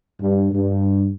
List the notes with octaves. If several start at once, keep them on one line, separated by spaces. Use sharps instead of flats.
G2
G2